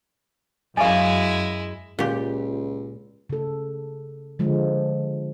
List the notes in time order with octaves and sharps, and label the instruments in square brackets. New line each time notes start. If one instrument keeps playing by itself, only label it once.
[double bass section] F#2 [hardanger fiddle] G#3 E4 [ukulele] D5 F5 [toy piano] G#5 A5 C#6
[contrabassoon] C#2 [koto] A#2 G4
[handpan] C#3 A4
D3 F3 G#3